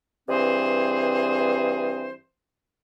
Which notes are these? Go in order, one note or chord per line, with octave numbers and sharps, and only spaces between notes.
G2 E3 C4 G#4 C5